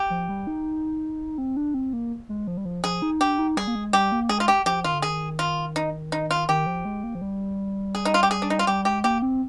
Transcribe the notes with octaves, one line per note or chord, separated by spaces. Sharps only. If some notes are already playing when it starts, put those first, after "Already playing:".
Already playing: G4
F3
G3
D#4
C4
D4
C4
A#3
G#3
F3
G3
F3
F3 G#4
D#4
D4 G4
D#4
G3 G#4
A#3
G#3
G3 G4
A#3
G#3 G#4
F4
G4
F3 G4
D#3 F4
D3
D#3 G#4
F4
D#4
D#4
F4
D#3 G4
F3
G#3
A#3
F3
G3
G#4
D#4
F4
G4
G#4
D4
D#4
F4
G3 G4
G#3 G4
A#3 G4
C4